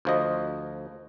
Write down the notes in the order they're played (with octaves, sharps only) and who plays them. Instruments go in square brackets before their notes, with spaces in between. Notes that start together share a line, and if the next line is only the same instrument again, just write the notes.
[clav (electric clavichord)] D2 F3 D#5